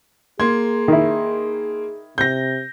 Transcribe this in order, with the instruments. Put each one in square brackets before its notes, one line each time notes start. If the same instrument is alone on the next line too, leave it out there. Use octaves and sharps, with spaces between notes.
[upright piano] A#3 C6 G#6 [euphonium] G#4
[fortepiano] D#3 E4
[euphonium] C3 [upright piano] G6 A#6